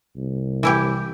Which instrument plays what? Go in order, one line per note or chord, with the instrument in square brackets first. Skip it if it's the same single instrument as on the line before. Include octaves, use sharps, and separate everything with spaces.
[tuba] C2
[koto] E3 E4 G4